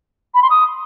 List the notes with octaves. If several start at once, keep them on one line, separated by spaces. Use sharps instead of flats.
B5
C6
D#6